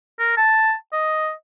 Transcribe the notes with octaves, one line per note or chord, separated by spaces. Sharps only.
A#4
A5
D#5